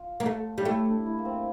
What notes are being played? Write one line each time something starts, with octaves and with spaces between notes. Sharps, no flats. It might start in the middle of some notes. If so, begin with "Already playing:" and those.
Already playing: F4
A#3
A3
G3
A3 E4
D4
E4
A#3
C4